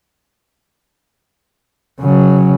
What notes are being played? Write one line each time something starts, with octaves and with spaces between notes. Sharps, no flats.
C#3 F#3